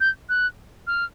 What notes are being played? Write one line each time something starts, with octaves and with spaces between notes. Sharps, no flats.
G6
F#6
F6